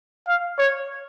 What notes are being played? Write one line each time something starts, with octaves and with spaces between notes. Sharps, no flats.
F5
C#5